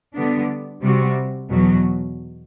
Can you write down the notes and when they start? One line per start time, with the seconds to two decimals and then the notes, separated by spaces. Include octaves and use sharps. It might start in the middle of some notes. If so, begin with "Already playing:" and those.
0.14 D3 G3 B3 D4
0.82 C3 G3 C4 F#4
1.50 E2 B2 F#3